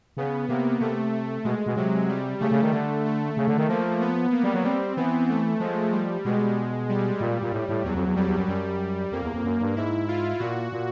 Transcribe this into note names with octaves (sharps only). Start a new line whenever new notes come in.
C#3 B3
C3 A#3
C3 A3
A3
B2 G#3
B2
C3 F#3
G3
C#3 A3
C#3
D#3
D3
A3
C#3
D3
D#3
F3 A#3
B3
A#3
G3
F#3
G3 C4
E3 B3
A3
F3 G#3
G3
B2 G#3
G3
A#2
A#2
A2
A2
E2 F#3
F2
E2
F2 G3
E2
F#2
F#2 G3
F2 A#3
E2
F2
F#2
G2
G#2 E4
F4
A#2 F#4
A#2